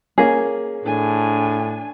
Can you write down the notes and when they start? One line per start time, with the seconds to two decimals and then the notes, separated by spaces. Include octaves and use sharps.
0.18 A#3 C#4 G#4
0.84 A2 D4 G#5